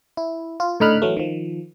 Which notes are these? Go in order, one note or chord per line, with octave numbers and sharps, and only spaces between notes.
E4
F4
A2 D3 D#4 B5 F6 F#6
E3 F#3 A3
D#3 F3